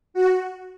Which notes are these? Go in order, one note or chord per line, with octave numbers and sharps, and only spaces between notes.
F#4